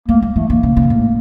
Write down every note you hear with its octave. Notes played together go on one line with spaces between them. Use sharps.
A3 A#3
G3
E3 A3
D3 A#3
C#3
C#3
A2